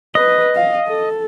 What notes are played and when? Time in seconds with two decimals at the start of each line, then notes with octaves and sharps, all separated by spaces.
0.15 B4 D#5
0.56 F5
0.88 A4